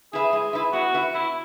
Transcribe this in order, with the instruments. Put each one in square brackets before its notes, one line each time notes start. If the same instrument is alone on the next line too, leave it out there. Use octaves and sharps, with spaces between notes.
[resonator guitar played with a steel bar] E4 B4 E5 [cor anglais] G#4
[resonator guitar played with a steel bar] G#3
E4 B4 E5
[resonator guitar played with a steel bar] B3 [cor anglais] F#4
[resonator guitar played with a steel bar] E4 B4 E5
[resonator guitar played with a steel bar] B3 [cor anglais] E4